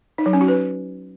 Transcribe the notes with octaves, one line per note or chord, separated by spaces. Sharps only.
D#4
F#3
C#4
F#4
B4